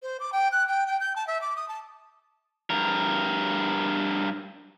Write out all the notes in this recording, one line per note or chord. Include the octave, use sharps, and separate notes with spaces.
C5
D6
G5
F#6
G5
G5
G6
A5
E5
D6
D#6
A5
G2 A#4